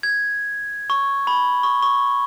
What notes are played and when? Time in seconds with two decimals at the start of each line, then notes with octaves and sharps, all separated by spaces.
0.03 G#6
0.90 C#6
1.27 B5
1.63 C#6
1.82 C#6